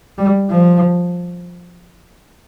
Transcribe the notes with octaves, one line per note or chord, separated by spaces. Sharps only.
G3
F3